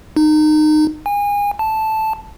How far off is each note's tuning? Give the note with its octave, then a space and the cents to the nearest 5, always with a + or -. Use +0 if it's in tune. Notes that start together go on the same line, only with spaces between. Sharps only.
D#4 -25
G#5 -30
A5 -5